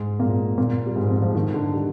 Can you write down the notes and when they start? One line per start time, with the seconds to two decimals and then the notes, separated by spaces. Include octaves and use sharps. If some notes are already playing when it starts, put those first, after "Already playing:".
Already playing: G#2 G#3
0.20 A#2 A#3
0.58 A#2 A#3
0.86 G3
0.96 G#2 G#3
1.09 F2 F3
1.22 F2 F3
1.35 D#3
1.54 D3
1.74 G3